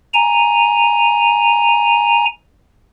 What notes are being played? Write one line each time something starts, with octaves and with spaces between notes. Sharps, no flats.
G#5 A#5